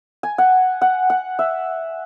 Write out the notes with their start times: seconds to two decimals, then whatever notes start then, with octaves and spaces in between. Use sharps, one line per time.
0.23 G#5
0.38 F#5
0.81 F#5
1.10 F#5
1.39 E5